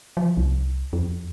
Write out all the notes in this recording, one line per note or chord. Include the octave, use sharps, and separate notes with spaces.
F3
C2
F2